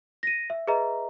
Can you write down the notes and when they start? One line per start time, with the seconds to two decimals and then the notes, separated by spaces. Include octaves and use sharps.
0.23 A#6 D#7
0.50 E5
0.67 G#4 B4 D#5 E5 A#5